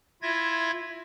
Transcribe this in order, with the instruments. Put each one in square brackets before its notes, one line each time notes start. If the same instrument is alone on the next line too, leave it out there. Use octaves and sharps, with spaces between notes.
[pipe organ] E4 F4 E5 G#6 A#6